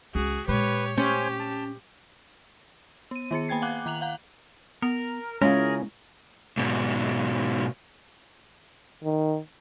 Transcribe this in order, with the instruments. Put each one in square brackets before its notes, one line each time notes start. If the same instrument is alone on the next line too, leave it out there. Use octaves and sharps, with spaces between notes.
[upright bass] C#2 [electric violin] F#4 G#4
[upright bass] A#2 G#3 [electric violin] G4 C#5 [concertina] B4
[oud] C#4 [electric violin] G4 [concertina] C5 C#5 G#5
[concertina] A5
[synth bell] B3 D#7
D#3 B3 G#4 C#7
A#3 G5 G#5 G#6 C7
F5 F#5 D6 F#6
D#3 A#5 F#6 F7 F#7
F5 F#5 A#5
[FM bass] B3 [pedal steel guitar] A#4
[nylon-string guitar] C#3 E4 F4 [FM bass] G#3 [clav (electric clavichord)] C#4 [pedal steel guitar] G#4 A#4
[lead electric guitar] G#2 B2
[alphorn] D#3